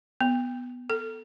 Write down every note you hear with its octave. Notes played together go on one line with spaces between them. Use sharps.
B3
A4